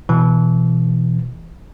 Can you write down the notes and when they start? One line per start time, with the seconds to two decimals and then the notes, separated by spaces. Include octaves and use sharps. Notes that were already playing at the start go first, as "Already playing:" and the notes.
0.09 B2 E3